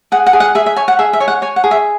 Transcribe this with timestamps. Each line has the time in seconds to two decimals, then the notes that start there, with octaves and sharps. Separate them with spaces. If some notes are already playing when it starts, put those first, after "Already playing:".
0.12 G#4 F#5
0.26 F#5
0.33 G#4
0.40 F#5
0.55 G#4 E5
0.66 E5
0.76 C#5 G#5
0.88 F#5
0.99 G#4 E5
1.13 E5
1.20 C#5 G#5
1.28 F#5
1.42 C#5 G#5
1.56 F#5
1.64 G#4
1.71 E5